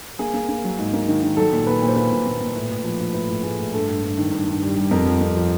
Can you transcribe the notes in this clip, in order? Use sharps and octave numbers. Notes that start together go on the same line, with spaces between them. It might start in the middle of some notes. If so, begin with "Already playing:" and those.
A#3 G#4
A#3
A#3
F#3
G#2
A#3
D#3
D#3
F#3 A4
A#2
A#2 B4
A#2
C5
A#3 B4
A#2
A#2
A#2
A2
A2
F3
F3
A2 B4
A2
A2 G#4
A2
G2 A4
G2
G2
D#3
G2
G2
G3
G3
F2 A#4
F3
F2
F3